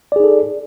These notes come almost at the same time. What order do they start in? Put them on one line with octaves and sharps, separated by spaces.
D5 G#4 D#4 A4